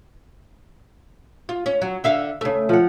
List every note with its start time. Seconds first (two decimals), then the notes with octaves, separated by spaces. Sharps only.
1.49 F4
1.66 C#4
1.82 F#3
2.04 D3 E5 F5
2.41 C#3 A3
2.69 F3 F#5